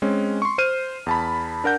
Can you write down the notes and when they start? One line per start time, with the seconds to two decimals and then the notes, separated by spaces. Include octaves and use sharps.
0.02 G#3 C4 C#4
0.42 C6 C#6
0.58 C5 F6 D#7
1.06 E2 A5 B5
1.64 D4 A#4 F#5 G6